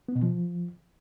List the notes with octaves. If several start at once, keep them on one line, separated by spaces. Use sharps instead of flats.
B3
B2
F3